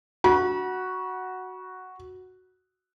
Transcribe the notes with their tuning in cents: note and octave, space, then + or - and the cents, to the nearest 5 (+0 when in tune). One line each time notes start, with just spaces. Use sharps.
F#4 +0 B5 -40